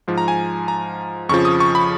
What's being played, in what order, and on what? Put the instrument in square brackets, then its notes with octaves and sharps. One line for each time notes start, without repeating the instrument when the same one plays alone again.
[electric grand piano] G#2 F3
A#5
G#5
A#5
F2 C#3 F3 C#6
D#6
C#6
B5